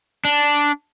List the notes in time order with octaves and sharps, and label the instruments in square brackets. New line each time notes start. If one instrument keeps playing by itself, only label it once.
[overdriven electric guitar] D4